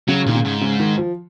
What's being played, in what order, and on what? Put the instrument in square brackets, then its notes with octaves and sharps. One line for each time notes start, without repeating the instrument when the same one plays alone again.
[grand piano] C#3 [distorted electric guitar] F#3
[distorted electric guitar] A#2 [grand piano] D#3
[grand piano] C#3
[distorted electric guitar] G#2
[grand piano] C#3
D#3
F3